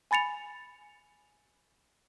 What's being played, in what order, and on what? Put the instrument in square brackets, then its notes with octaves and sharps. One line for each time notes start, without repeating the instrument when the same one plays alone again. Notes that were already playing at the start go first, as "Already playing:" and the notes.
[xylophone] G#5 B5 A6 C#7 F7